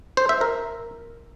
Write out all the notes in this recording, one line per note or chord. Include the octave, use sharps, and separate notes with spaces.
C5
E5
A#4